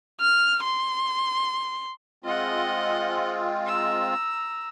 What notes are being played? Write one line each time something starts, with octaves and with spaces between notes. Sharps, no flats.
F6
C6
G#3 C4 F4 D#5 F#5
A#5 E6